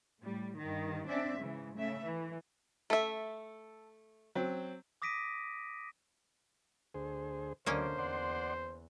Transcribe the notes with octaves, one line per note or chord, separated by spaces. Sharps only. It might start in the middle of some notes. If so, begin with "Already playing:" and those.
A2 G3
G2 D#3
C4 D4 D5 E5
G#2 C#3 E3
C#3 A3 E5
E3
A3 A4 E5
F#3 C4
D6 D#6 A#6 B6 D7 D#7
D2 G#4 C5
D2 D3 F#3 A#3 C#4 C5 D5 D#5
E2 D5 F#5 C6